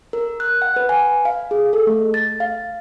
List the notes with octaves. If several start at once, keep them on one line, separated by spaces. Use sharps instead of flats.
A#4
F#6
F#5
B4
G#5
F5
G#4
A4
A3
A6
F5